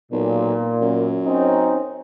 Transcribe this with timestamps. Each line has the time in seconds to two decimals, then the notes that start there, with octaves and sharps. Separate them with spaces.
0.12 B1 A#2
0.82 F#2
1.25 C4 C#4 D#4